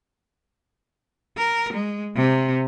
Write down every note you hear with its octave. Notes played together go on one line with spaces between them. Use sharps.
A#4
G#3
C3